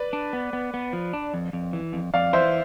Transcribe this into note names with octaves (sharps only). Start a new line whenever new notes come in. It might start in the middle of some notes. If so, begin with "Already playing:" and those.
Already playing: B4 D5
D4
B3
B3
B3
F3
D4
F2
F2
E3
F2
F2 D5 F5
E3 C5 E5